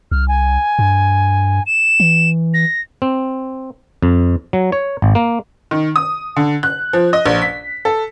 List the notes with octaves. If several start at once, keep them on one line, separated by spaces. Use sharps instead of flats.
C2 F6
G#5
G2
E7
E3
A#6
C4
F2
F#3
C#5
G#1
A#3
D#3
D#6
D3
F#6
F3
D#5
A#1
B6
A4